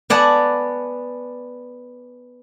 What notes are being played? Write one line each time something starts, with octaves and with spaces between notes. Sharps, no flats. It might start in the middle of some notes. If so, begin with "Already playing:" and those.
B3 D5 F#5 G#5 A5